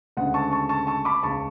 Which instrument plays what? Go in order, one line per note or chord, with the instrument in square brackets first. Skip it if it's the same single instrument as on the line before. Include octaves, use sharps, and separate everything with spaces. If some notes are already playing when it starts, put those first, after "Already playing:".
[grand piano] D2 C#3 G#3 F#5
A5 C#6
A5 C#6
A5 C#6
A5 C#6
B5 D6
C#2 C#3 G#3 A5 C#6